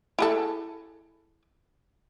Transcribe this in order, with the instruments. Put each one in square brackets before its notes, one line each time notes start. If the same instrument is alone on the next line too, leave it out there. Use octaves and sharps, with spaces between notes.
[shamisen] E4 G#4 A4